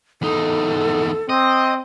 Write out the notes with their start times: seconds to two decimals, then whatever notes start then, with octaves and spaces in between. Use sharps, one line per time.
0.22 E2 D#4 A4
1.29 C4 D#5